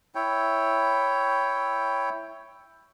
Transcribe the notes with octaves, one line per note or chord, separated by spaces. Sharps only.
E4 C#5 G5